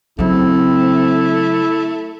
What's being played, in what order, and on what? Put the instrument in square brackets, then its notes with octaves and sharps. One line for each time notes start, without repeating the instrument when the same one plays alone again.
[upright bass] C#3 F#3 [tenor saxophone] A3 [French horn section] C4 [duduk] E4